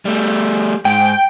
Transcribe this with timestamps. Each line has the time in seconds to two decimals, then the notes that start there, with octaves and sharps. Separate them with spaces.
0.05 G3 A3
0.85 G#2 G5